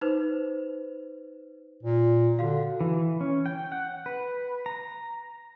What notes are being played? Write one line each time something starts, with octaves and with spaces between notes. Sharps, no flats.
D#4 B4 C5
A#2
D3 F#4 F5
E3
C#4
G5
F#5
B4
A#5